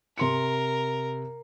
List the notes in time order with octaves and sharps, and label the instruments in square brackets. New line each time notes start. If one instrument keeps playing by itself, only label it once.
[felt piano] C3 C6 C#7 [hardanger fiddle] A#4